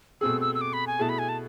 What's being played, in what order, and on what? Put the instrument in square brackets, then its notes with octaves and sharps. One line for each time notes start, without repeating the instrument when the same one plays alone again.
[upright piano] B2 A3 C4 G#4 [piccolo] E6
[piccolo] E6
E6
D6
B5
G#5
[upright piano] B2 A3 E4 G#4 [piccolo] A5
[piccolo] B5
G#5
A5